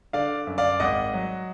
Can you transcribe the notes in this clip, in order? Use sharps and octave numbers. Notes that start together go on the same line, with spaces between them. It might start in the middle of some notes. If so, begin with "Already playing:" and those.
D3 D5 F5
F#2
D5 F5
G#1 D#5 F#5
F#3